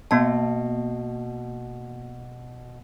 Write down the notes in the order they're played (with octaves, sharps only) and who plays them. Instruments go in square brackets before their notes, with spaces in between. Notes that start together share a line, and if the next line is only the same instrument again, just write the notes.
[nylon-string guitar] B2 [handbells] A#3 B3 A5